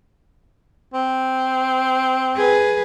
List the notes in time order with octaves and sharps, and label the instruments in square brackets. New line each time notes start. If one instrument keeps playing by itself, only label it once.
[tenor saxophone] C4
[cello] G#4 B4